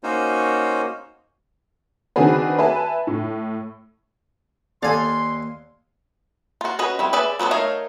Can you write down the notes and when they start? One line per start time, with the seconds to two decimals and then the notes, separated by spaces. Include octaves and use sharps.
0.03 A#3 C#4 D#4 F#4 C5 C#5
2.16 D#3 C4 D4 F#4 G#4 B4
2.59 B4 E5 G#5 A5
3.07 A2
4.83 D#2 A4 D5 F5 G#5 C6
6.61 F4 F#4
6.79 C#4 F#4 B4 D#5
6.99 G3 C4 E4
7.13 G#4 B4 D5 E5
7.39 F#3 B3 C4 D4
7.51 A3 D#4 A#4 C#5 F5